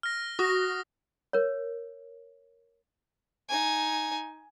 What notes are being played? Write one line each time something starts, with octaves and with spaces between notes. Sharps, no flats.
F6 A#6
F#4 D#6 A#6
A#4 C#5
D#4 G#5